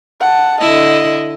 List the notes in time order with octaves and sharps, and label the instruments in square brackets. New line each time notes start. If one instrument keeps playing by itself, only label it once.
[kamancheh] F#5 A5
[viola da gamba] D3 E4 [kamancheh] D#5